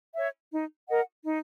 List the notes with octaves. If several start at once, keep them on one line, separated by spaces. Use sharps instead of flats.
C#5 E5
D#4
A#4 D#5 F#5
D#4